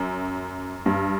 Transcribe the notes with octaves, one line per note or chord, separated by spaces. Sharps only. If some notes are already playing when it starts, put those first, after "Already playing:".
Already playing: F#2
G2